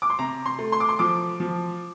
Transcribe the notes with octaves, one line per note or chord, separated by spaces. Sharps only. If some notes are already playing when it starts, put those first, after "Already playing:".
D6
C6
C3 A#5
C6
A3
C6
D6
C6
F3 D6
F3